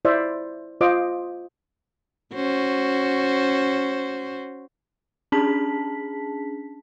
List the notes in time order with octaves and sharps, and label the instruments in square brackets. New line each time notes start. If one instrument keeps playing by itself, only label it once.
[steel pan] E4 C5 D5 E5
F4 C5 D#5 D6
[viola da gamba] C#4 F#4 C5
[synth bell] C#4 D4 G#4 A5 B6